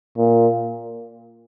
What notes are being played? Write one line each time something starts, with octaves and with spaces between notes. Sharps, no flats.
A#2